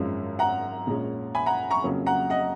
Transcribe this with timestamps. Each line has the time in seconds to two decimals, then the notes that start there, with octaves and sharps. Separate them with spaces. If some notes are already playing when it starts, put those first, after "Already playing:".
Already playing: G#1 F#2 F3 G#3 C#4
0.39 F#5 A#5
0.87 A#1 A#2 G#3 C#4
1.35 G#5 B5
1.46 F#5 A#5
1.70 A#5 C#6
1.82 F2 C#3 F#3 A#3 C#4
2.06 F#5 A#5
2.30 D#5 F#5